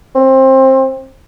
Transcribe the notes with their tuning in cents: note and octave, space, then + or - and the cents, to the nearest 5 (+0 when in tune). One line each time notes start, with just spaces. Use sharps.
C4 +20